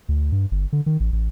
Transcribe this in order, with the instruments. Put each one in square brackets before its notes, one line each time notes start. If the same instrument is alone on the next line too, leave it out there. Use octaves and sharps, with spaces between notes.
[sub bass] D2
G2
G1
D3
D#3
A1
A1